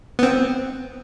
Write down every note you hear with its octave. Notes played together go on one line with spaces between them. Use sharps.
B3 C4